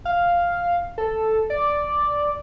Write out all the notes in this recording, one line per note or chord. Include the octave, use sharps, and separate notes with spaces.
F5
A4
D5